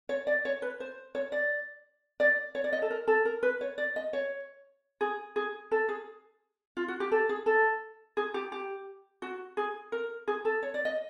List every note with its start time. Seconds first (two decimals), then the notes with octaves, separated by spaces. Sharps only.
0.09 C#5
0.27 D5
0.45 C#5
0.62 B4
0.80 C5
1.15 C#5
1.32 D5
2.20 D5
2.55 C#5
2.64 D5
2.73 D#5
2.82 A4
2.90 A#4
3.07 A4
3.25 A#4
3.43 B4
3.61 C#5
3.78 D5
3.96 D#5
4.13 C#5
5.01 G#4
5.36 G#4
5.71 A4
5.89 G#4
6.77 F4
6.88 F#4
7.00 G4
7.11 A4
7.29 G#4
7.46 A4
8.17 G#4
8.34 G4
8.52 G4
9.22 F#4
9.57 G#4
9.92 A#4
10.28 G#4
10.45 A4
10.63 C#5
10.74 D5
10.85 D#5